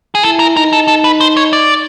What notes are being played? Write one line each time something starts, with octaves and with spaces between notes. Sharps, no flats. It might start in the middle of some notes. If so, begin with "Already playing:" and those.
G#4
E4 A4
A#4
D#4 A#4
A4
A4
B4
C5
C#5
D5